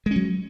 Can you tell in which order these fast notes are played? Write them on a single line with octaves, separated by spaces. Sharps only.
G#3 C#4 F#3